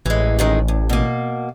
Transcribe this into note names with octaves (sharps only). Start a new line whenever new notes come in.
A1 E3 G#3
F#2 D#3 G#3
D2
B2 A#3